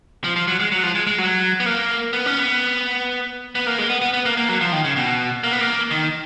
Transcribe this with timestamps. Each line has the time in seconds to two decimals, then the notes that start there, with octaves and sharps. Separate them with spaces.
0.24 F3
0.36 F3
0.48 F#3
0.60 G#3
0.72 F#3
0.83 F3
0.95 G#3
1.07 G#3
1.18 F#3
1.60 B3
1.66 A#3
2.13 B3
2.26 C#4
2.38 B3
3.55 B3
3.67 A#3
3.78 G#3
3.89 B3
4.02 B3
4.14 B3
4.25 A#3
4.37 A#3
4.49 F#3
4.61 F3
4.72 D#3
4.84 C#3
4.96 B2
5.43 A#3
5.52 B3
5.61 A#3
5.91 D#3